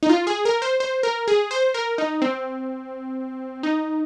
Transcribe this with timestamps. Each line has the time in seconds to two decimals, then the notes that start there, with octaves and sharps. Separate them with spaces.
0.03 D#4
0.09 F4
0.27 G#4
0.45 A#4
0.62 C5
0.80 C5
1.03 A#4
1.28 G#4
1.51 C5
1.74 A#4
1.98 D#4
2.22 C4
3.63 D#4